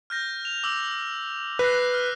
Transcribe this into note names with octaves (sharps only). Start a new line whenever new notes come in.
F6 G6 A#6
F7
D6 E6
B4 F#6 A#6 C7
F6